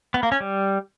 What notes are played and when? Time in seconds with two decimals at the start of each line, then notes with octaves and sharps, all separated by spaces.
0.14 B3
0.23 A#3
0.32 C#4
0.40 G3